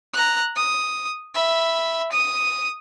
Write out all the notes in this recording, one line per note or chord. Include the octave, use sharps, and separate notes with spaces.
A#5 F#6
D#6
E5 B5
D#6 D#7